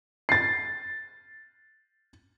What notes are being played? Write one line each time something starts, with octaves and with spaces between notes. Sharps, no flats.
A6 C7